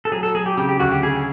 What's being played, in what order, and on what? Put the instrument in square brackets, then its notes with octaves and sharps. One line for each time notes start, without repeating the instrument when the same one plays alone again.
[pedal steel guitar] A4
[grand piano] F#3 [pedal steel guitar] G#4
[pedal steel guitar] A4
[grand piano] F#3 [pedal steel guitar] G#4
[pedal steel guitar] G4
[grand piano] C#3 [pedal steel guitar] G4
[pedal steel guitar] G4
[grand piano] D2 [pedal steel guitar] F#4
[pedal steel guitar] G4
[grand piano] C#3 [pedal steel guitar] G#4